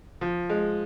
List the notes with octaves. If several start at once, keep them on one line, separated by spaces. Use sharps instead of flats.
F3
G#3